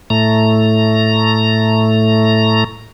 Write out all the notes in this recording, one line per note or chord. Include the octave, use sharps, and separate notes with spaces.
A2 A3 A#5